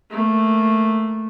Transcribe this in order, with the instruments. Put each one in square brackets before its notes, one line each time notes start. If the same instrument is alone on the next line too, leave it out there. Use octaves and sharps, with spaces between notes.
[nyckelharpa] A3 A#3